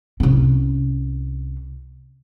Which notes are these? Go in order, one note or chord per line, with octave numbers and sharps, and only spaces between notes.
C2 C#4